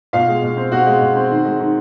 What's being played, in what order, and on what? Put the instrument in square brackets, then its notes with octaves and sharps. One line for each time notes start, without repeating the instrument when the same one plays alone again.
[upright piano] B2 F4 F5
G#3
B2
C4
B2 F#4 F#5
G#3
B2
C4
D#3
G#3
D#3